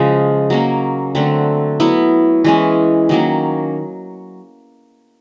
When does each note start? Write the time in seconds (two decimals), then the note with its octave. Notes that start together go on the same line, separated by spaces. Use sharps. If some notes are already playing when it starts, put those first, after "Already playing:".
Already playing: C#3 F3 G#3
0.50 F#3 A#3 C#4
1.15 D3 F#3 A3 C4
1.80 F#3 B3 E4
2.44 E3 G#3 C#4
3.09 D#3 F#3 A#3 C#4